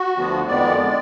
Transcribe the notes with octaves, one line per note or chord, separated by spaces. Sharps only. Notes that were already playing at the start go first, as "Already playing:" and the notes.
Already playing: F#4
D2 D3 F3 B3
F2 D#3 G#3 B3 D5
D3 G#3